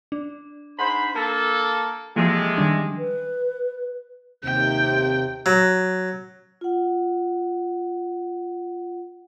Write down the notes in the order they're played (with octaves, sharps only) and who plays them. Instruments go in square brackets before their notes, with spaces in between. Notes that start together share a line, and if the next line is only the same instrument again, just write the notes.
[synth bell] D4
[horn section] G#2 C5 B5
A#3 A4
[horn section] A2 C3 G#3 [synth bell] E3 F3 A#3
[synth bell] D#3 G3 D4
[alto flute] B4
[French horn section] D#2 C3 [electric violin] G5
[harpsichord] F#3
[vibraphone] F4 F#5